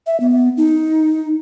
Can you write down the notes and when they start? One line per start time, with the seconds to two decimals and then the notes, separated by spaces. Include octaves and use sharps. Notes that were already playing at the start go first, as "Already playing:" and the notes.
0.07 E5
0.20 B3
0.57 D#4